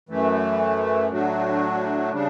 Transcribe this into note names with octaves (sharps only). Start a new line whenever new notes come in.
F#2 E3 A3
A2 F#3 A3 D4 F#4
C#3 G3 D4